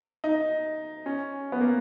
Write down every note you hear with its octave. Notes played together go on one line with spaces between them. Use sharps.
D#4
C#4
B3
A#3